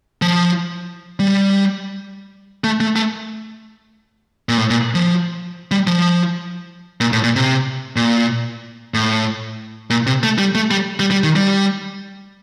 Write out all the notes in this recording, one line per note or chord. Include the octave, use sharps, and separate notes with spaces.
F3
G3
A3
A3
A3
A#2
A2
A#2
F3
G3
F3
A#2
A2
A#2
C3
A#2
A2
A#2
C3
A3
G3
A3
G3
G3
G3
D#3
G3